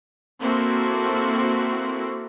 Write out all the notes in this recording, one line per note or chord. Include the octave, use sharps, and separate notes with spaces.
A#3 C4 E4 F#4 A4